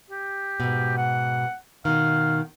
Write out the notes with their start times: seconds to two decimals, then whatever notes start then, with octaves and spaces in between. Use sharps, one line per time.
0.10 G4
0.60 G#2 B2
0.98 F#5
1.85 B2 D#3 F5